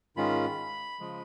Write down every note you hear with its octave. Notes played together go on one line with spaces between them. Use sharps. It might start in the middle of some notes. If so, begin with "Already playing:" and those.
G#2 D#3 G#3 C#4 F4 B5
C#3 F3 G#3